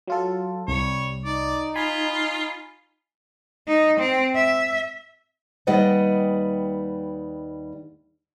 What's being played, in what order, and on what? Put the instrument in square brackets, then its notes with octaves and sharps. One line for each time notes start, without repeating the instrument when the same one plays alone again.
[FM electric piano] F#3 F4 A4
[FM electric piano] C2 [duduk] G3 [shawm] C#5
[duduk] D#4 [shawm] D5
[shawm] F4 [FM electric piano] G#5 B5
[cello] D#4
C4
E5
[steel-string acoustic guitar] D#2 G3 B4 D#5 F#5 G5